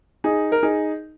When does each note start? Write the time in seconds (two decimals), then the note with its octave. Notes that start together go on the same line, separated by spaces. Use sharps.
0.24 D#4 G#4
0.52 A#4
0.63 D#4 G#4